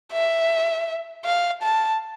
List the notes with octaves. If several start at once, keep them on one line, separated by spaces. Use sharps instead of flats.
E5
F5
A5